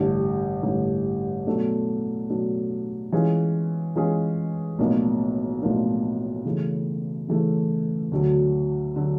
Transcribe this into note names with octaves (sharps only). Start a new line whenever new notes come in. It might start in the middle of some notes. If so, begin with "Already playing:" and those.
Already playing: A1 G2 D3
A1 G2 D3
B2 F#3 A3 D4
B2 F#3 A3 D4
E3 G#3 C#4 F4 G#4
E3 G#3 C#4 F4 G#4
B1 A2 F3 A#3 D4
B1 A2 F3 A#3 D4
C#3 E3 A3
C#3 E3 A3
D2 D3 F#3
D3 F#3